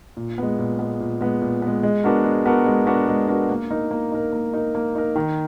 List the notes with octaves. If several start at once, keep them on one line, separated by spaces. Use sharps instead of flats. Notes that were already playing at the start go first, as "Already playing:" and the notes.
A#2
G#3 B3
A#2
G#3 B3
A#2
G#3 B3
A#2
G#3 B3
G#3
B3 D4 F#4 A#4
G#3
B3 D4 F#4 A#4
G#3
B3 D4 F#4 A#4
G#3
B3 D4 F#4 A#4
A#3
D#4 A#4
A#3
D#4 A#4
A#3
D#4 A#4
A#3
D#4 A#4
D#3